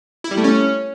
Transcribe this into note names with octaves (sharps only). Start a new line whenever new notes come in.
E4
G3
A3
C#4